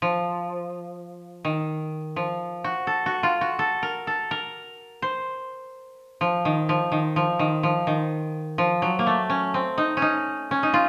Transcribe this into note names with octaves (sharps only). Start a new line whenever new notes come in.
F3
D#3
F3
F#4
A4
F#4
F4
F#4
A4
A#4
A4
A#4
C5
F3
D#3
F3
D#3
F3
D#3
F3
D#3
F3
F#3
A#3
A3
C#4
C4
D#4
C#4
D#4
C#4
D#4
F4